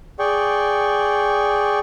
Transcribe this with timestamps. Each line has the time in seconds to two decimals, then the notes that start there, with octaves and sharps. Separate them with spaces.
0.19 G#4 D5 G5 C#6